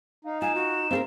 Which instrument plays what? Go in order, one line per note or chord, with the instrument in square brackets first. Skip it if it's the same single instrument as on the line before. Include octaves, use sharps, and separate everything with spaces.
[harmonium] D#4 [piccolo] F5
[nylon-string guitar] F4 [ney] G#5 [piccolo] E7
[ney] F#4
[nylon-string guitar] C4 A4 A#4 [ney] F5